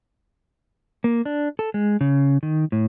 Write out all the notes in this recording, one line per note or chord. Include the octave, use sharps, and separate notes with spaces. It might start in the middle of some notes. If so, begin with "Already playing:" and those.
A#3
D4
A4
G#3
C#3
D#3
A2